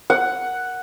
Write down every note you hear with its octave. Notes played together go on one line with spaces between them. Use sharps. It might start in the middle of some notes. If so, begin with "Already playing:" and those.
F#5